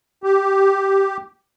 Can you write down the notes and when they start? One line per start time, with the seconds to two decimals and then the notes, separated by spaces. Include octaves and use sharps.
0.24 G4